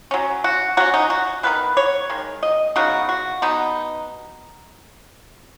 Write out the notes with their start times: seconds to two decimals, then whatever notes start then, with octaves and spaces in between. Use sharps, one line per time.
0.11 F#3 C#4
0.44 F#4
0.77 F#3 C#4 F#4
0.94 D#4
1.10 F#4
1.43 D#3 B3 D#4 B4
1.77 C#5
2.10 D#3 G#3
2.43 D#5
2.76 C#3 B3 D#4 F#4
3.09 F#4
3.42 B2 B3 D#4